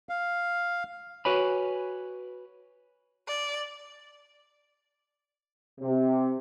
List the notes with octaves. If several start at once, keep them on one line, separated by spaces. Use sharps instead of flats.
F5
F#4 B4 C#5 G#5 B5
D5
C3